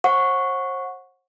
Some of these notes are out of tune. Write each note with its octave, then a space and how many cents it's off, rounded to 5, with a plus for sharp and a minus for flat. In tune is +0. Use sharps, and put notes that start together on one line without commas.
C5 +40 F#5 -15 C#6 +0